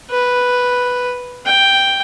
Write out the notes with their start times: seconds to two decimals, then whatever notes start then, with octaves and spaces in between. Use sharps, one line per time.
0.10 B4
1.46 G5